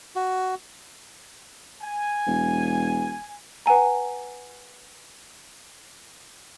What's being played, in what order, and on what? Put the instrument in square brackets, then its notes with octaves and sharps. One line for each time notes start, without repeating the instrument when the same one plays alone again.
[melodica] F#4
[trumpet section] G#5
[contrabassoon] E1
[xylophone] B4 F#5 G#5 A#5